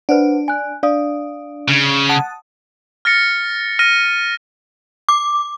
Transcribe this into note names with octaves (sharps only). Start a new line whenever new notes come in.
D4 B4 C5 F#5
G#5 F#6
D4 D5 F5 D#6
C#3
F#5 A5 D#6
F6 A6 A#6 C#7
F6 A#6 D#7
D6